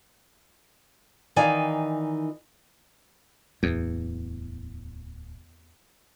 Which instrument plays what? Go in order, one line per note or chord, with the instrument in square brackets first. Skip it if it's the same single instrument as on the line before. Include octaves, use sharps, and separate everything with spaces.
[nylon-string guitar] D#3 E3 D#4 D5 F5 G#5
[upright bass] D1 [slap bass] E2